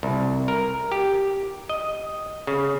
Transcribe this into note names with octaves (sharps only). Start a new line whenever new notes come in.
C2
A#4
G4
D#5
C#3